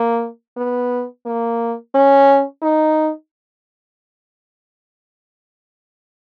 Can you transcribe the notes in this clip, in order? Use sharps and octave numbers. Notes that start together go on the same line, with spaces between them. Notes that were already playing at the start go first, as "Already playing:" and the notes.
Already playing: A#3
B3
A#3
C#4
D#4